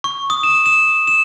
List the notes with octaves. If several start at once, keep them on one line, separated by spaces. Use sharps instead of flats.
C#6
D#6
E7
E7
E7